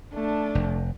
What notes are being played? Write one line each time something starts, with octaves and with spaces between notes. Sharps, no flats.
A3 D4
F1